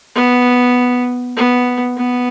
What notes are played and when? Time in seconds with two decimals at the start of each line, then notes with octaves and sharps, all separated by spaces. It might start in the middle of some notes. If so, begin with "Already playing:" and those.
0.15 B3
1.37 B3
1.97 B3